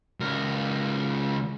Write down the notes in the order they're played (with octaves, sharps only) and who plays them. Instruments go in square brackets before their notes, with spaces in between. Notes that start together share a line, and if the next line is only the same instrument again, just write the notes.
[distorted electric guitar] C#2 A#4